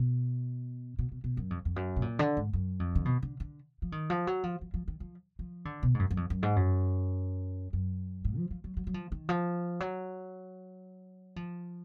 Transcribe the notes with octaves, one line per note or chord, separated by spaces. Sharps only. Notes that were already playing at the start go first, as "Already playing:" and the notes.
Already playing: B2
B2
B2
B2
F#2
F2
F2
F#2
B2
A#2
D3
G#2
F#2
F2
D3
B2
D3
D3
F3
D#3
F3
F#3
F3
F3
F3
D#3
F3
F3
D3
B2
G#2
F#2
F#2
F2
F#2
G#2
F#2
F#2
G#2
F3
F3
F#3
F#3
F#3
F3
D#3
F3
F#3
F3